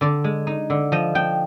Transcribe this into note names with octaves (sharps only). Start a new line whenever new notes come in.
D3 D5
G#3
D#4
D3
F3 D#5
F3 G5